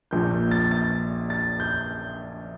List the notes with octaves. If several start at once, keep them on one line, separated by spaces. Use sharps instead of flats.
A#1 A#2 F3 G6
G6
A6
A6
A6
G6